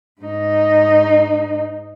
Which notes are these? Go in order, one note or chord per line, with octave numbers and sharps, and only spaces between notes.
G#2 D#4